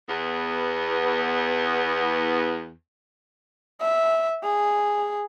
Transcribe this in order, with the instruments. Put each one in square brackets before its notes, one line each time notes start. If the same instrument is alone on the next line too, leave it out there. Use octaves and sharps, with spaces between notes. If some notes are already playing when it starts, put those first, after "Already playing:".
[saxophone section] E2 B3
[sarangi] E5
G#4